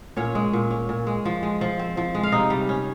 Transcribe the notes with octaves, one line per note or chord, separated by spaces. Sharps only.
A#2 C#4 C#5
G#3
A#2
C#4
A#2
G#3
F3
G#3
F3
C4
F3
G#3
F5
C3 D#4 D#5
G3
C#4